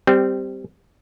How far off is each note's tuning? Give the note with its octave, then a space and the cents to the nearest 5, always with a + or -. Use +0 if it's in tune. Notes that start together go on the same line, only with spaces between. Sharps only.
G3 +0 C4 -15